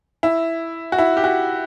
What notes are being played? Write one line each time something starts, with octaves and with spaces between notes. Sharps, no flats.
E4
F#4
E4
G4
F#4